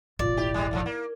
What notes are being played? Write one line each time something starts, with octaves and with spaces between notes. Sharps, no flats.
E1 A1 F4 D5
E4 G4
G3 G#3
F2 G#2 F3
A#3